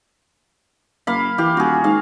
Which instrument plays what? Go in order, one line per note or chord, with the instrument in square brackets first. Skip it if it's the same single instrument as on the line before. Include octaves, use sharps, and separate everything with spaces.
[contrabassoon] F#1 [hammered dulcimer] A#3 F5 B5
[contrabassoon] E3 [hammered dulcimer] G4 F5
[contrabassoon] D#1 [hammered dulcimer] F#4 G#4
[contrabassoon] G#2 [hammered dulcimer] F5